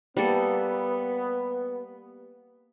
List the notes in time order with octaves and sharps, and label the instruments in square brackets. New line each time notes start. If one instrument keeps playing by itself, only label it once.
[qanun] G3 A#3 A4 [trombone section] B3